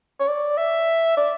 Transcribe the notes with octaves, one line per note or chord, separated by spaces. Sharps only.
C#5
D5
E5
D5